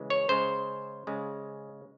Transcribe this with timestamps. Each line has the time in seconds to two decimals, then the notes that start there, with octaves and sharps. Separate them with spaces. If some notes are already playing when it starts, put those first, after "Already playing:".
Already playing: C#3 E3 G#3
0.10 C#5
0.29 C#3 G#3 C5
1.07 C#3 G#3